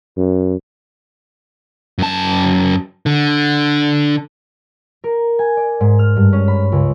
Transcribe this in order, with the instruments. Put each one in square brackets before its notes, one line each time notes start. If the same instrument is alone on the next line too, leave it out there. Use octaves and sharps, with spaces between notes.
[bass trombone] F#2
[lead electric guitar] F#2 A5
D3
[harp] A#4
G#5
D5
G#2
F6
G2
C#4
B5
C#2